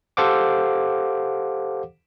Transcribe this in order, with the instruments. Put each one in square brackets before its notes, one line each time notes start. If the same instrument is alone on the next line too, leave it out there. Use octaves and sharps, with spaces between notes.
[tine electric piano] G4 A4 C5 F5 F#5 D6